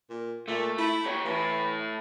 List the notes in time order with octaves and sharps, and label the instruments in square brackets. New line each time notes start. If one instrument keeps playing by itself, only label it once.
[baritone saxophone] A#2
[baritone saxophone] A#2 [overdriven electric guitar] A3
[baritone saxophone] E4
[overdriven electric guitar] G4 C#5
[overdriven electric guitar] A2 E4 [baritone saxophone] E3